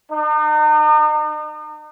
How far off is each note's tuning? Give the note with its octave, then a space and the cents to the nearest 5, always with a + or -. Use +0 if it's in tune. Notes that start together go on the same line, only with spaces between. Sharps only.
D#4 -40